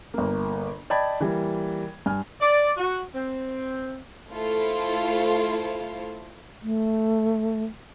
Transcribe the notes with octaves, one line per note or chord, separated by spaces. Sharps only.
G1 A#3
D5 D#5 G5 A5 B5 G#6
E3 G3 A#3
G2 G#5 F6
D5
F#4
C4
A3 E4 F4 A4 C5 F5
A3